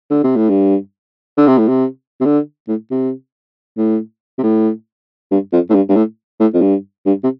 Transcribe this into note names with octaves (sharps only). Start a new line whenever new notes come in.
D3
C3
A2
G2
D3
C3
A2
C3
C3
D3
A2
C3
A2
C3
A2
G2
F2
A2
G2
G2
A2
A2
F2
G2
G2
C3